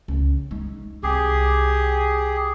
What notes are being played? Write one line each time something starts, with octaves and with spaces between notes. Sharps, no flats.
C#2 C#3
G#3 D#4
C2 G4 G#4